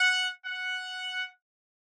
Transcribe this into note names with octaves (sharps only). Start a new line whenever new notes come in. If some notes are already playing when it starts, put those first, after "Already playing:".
Already playing: F#5
F#5